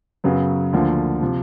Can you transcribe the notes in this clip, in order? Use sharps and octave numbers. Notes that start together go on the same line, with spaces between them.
F#2 C#3 F#3 B3
D2 D3 F3 A#3
C3 F3